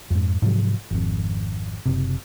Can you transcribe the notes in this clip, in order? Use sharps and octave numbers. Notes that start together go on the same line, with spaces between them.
F2 G#2
G#2 C3 F3 F#3
G#1 F2
F#1 C3